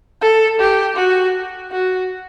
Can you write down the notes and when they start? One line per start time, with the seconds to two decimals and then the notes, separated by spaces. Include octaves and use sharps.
0.21 A4
0.60 G4
0.96 F#4
1.72 F#4